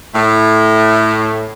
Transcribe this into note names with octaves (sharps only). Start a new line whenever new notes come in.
A2 A3